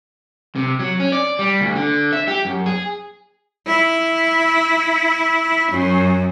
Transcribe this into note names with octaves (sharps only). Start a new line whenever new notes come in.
C3
F#3
C#4
D5
G3
D2
D3
E5
G4
F#2
G#4
E4
F#2